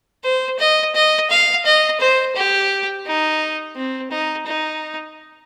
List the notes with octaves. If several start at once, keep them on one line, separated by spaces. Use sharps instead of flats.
C5
D#5
D#5
F5
D#5
C5
G4
D#4
C4
D#4
D#4